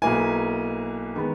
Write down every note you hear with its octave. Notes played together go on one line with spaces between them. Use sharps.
B1 B2 A#3 E4 G#5
D#3 G#3 B3